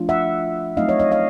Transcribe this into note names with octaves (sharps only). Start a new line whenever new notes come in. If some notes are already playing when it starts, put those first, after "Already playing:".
Already playing: F3 A3 D4 F4
E5 F#5
F#3 A3 C4 D#4 D#5 F5
C#5 D#5
C#5 D#5
D#5 F5